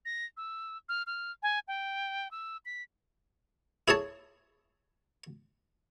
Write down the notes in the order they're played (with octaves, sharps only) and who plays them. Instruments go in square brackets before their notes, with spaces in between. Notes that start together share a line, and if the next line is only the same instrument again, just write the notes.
[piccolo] A#6
E6
F6
F6
G#5
G5
E6
B6
[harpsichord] E4 G#4 C#5 A5